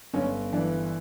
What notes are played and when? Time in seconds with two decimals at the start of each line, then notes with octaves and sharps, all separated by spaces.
0.14 G1 C#4
0.53 E3 D4